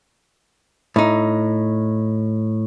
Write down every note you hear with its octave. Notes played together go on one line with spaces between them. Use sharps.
A2 D#4